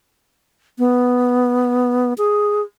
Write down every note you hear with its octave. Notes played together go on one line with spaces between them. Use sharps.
B3
G#4